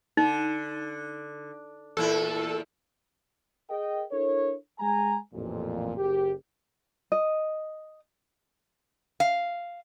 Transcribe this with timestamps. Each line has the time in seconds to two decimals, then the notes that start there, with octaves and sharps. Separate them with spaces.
0.17 D3 D#4
1.97 E2 A#2 E4 A4
3.70 G#4 A#4 D#5 G5
4.11 D4 E4 A4 A#4 C#5
4.79 G#3 G#5 A#5
5.33 A1 F2 A#2
5.97 F#1 G4
7.12 D#5
9.20 F5